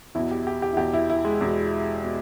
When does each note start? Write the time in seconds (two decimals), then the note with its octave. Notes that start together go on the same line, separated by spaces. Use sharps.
0.15 E2 B2 E4
0.31 G4
0.47 G4
0.62 G4
0.73 E4
0.77 E2 B2 G4
0.93 E4
1.10 E4
1.25 G#3
1.41 E2 B2
2.04 B2